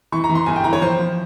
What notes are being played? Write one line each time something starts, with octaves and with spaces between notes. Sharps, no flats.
E3 C#6
A#5
E3
C6
G1 G#5
G5
E3 A#5
C#5
F3 C5
F3